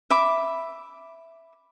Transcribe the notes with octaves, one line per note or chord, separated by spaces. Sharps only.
E5 B5 D6